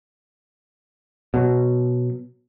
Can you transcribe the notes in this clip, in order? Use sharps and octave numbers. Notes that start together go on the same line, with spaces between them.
B2 F#3